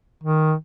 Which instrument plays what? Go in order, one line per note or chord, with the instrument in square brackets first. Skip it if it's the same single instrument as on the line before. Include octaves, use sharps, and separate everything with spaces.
[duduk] D#3